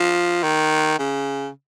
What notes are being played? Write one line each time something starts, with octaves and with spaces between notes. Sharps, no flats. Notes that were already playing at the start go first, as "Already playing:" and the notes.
Already playing: F3
D#3
C#3